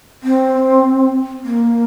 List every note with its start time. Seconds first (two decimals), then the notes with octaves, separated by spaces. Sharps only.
0.23 C4
1.44 A#3